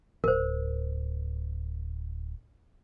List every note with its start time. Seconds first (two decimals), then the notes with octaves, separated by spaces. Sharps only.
0.24 D1 A#4 C5